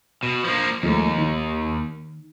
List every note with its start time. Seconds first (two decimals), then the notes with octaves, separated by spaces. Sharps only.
0.23 B2
0.45 F3 A#3
0.83 D#2 F3 G#3 A3
1.18 D#3